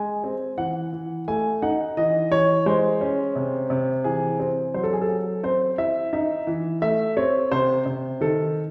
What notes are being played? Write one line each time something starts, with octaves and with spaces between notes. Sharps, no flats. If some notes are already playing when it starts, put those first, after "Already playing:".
Already playing: G#3 G#5
C4
E3 F#5
E3
A3 G#5
D#4 F#5
E3 D#5
E3 C#5
G#3 C5
C#4
C3
C3
E3 G#4
C4
F#3 C5
A4
G#4
A4
F#3
C4 C5
E4 E5
D#4 E5
E3
A3 E5
C4 C#5
C3 C5
C3
D#3 A4